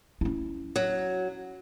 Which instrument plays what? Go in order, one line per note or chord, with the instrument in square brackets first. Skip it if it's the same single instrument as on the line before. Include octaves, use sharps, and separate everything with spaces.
[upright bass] C#4 E4
[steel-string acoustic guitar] F#3